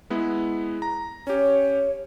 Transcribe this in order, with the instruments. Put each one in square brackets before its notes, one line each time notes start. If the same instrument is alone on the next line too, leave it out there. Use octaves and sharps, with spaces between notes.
[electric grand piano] G#3 B3 E4
A#5
[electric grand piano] C#4 G4 [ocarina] C#5